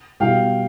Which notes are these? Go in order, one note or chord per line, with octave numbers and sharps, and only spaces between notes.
B2 G3 F5 G5